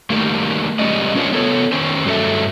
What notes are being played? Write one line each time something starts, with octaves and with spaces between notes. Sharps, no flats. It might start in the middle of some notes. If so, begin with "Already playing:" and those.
D#3 G3 A3 A#3
G3 G#3 C#4 D5 D#5
C#4 D4 F4 A#4 C5 C#5
B3 A4 C#5
D#3 C#4 C5
G2 F#3 A4 E5